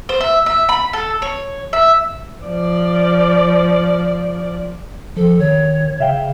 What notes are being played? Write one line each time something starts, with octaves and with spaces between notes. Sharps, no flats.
C5
E5
E5
B5
A4
C#5
E5
F3 D5
F3 A4
D#3 C#5
C#3 E5 F5 G5